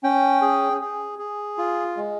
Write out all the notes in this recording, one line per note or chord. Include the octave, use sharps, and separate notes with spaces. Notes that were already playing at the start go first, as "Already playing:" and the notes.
C#4 G5
G#4
G#4
G#4
F4
G#3